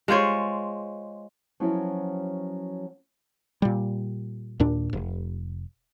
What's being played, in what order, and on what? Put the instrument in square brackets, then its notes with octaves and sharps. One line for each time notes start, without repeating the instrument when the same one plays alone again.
[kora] G#3 F4 C5 C#5
[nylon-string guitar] F3 F#3 B3 C#4 E4 F#4
[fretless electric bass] A#2 G3
D#2 A#2 D4
F1